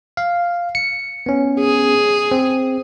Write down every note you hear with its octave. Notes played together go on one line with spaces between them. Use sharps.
F5
C#7
B3 C#4
G#4
C4